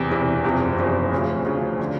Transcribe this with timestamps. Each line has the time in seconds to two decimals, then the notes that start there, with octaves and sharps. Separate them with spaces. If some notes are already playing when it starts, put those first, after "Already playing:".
Already playing: E2 C3 E3
0.11 E2 C3 E3
0.44 F#1 E2 C3 F3
0.79 F#1 E2 C3 F3
1.12 D2 C#3 F3
1.45 D2 C#3 F3
1.79 D3